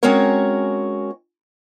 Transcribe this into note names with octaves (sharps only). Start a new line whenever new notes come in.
G#3 C4 C#4 F#4 A#4 C#5